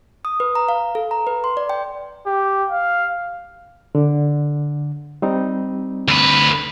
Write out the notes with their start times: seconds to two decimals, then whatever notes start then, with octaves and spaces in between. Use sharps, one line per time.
0.25 D#6
0.40 B4
0.55 A#5
0.68 F5
0.95 A4
1.11 A#5
1.27 B4
1.44 C6
1.57 D5
1.69 G5
2.26 G4
2.70 F5
3.95 D3
5.22 G3 C4 D#4
6.08 D2 B4